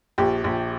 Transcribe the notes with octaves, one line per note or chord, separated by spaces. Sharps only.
A#1 G4
A#1